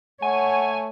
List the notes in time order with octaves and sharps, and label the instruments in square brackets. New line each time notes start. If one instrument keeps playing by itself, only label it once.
[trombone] A3 [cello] C#5 [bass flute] F#5 [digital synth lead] G#5